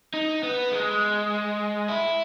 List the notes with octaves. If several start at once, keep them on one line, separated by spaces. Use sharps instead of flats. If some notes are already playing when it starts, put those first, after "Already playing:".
D#4
B3
G#3
E4